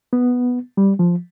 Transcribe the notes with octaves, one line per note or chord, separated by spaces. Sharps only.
B3
G3
F3